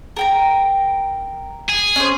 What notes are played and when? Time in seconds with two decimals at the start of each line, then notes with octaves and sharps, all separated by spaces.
0.17 A#4 G5 A#5
1.69 G#4
1.96 C#4 C5